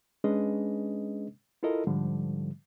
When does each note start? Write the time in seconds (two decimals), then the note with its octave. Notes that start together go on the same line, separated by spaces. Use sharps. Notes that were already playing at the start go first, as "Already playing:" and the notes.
0.24 G#3 C#4 D4 G#4 B4 D#5
1.63 E4 F4 A4 A#4 D#5
1.87 G#2 D3 F3 G3